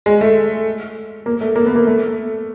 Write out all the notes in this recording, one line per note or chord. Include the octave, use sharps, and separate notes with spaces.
G#3
A3
A#3
A3
A#3
B3
A#3
A3